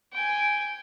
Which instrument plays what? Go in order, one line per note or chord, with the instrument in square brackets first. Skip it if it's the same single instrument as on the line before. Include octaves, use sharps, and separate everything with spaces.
[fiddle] G5 G#5